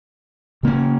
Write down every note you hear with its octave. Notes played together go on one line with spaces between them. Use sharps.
C#3 A#3 C#4